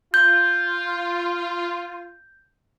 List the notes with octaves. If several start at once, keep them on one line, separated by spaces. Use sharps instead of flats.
F4 G6